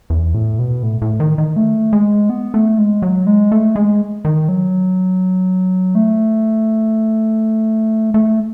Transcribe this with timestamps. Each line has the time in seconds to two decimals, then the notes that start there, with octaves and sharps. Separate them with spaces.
0.10 E2
0.34 A2
0.59 B2
0.83 A2
1.02 A2
1.20 D#3
1.38 D#3
1.56 A3
1.93 G#3
2.30 B3
2.54 A3
2.78 G#3
3.02 F#3
3.27 G#3
3.52 A3
3.76 G#3
4.25 D#3
4.49 F#3
5.95 A3
8.14 A3